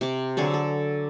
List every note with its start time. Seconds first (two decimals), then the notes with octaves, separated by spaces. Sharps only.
0.01 C3 D6
0.37 D3 F#3 G#4 A4
0.54 A4